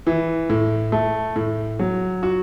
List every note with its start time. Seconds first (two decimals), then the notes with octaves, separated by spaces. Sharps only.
0.07 E3
0.50 A2
0.92 A3
1.36 A2
1.80 F#3
2.23 F#4